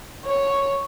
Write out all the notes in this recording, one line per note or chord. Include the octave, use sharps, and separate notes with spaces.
C#5